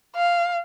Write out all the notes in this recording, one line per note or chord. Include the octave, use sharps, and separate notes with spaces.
F5